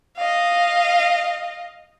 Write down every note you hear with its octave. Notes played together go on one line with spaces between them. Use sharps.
D#5 F5